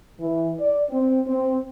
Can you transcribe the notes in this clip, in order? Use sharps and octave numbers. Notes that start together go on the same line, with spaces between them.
E3
D5
C4
C4